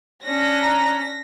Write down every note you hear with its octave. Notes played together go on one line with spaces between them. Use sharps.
C#4 D4 A#6 B6
A#5